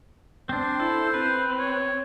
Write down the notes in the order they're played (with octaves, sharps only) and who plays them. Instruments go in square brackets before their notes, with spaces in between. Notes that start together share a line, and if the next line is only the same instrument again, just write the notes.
[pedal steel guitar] C4 D4 [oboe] C5
[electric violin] E4 [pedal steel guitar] A4
[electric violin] C4 [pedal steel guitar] B4
[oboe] C#5